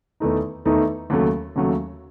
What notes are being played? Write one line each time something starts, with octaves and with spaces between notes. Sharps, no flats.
E2 D#3 A3 D#4
E2 D#3 A3 D#4
D#2 C#3 F#3 A3
D#2 C#3 F#3 A3